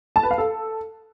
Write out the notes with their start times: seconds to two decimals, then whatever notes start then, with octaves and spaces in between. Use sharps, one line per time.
0.16 A5
0.23 B4
0.31 F5
0.38 A4